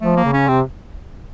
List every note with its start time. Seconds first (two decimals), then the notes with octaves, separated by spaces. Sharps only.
0.01 F3 A3
0.16 A#3
0.24 C#3
0.33 C#4
0.48 C3 C4